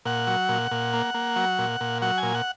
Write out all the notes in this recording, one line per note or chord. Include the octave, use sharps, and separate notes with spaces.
A#2 F#5
F#3
A#2
A#2
A#3
A#3
F#3
A#2
A#2
F#3 F#5
G#5
A#2
F#5